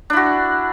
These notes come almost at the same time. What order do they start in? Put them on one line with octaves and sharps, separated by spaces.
D4 E4 F#4